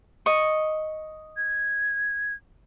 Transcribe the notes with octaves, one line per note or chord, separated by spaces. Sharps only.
D#5 C#6
G#6